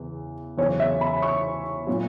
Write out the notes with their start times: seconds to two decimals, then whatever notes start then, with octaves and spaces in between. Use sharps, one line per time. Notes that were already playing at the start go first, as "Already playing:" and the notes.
Already playing: E2 C#3
0.58 E2 C#3 F#3 C#5
0.80 E5
1.01 B5
1.22 C#6
1.87 A#2 F#3